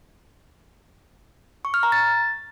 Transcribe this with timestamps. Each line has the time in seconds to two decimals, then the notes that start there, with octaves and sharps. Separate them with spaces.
1.65 C#6
1.74 F6
1.83 A#5
1.92 A6